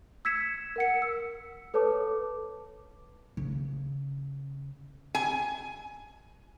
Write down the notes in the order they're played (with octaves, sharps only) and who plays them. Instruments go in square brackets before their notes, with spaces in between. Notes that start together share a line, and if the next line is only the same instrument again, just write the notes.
[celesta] E6 G#6 B6 C#7 E7
A#4 F#5 C#7
E6
A4 B4 C#5 A5 D6
[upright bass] C#3
[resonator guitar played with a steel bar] G#5